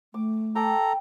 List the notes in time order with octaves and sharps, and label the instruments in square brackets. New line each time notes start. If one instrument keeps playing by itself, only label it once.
[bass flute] A3 [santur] D6
[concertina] A4 A#5 [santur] G5 D6